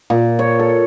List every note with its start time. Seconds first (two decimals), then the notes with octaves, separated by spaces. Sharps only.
0.10 A#2
0.39 C#5
0.59 A4